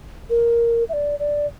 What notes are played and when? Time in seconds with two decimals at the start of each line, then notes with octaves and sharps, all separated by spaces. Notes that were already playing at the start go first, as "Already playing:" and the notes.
0.30 A#4
0.89 E5
0.93 D5
1.19 D5